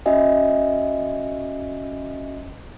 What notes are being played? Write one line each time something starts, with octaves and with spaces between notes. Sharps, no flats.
C#4 F#4 D#5 E5 G#5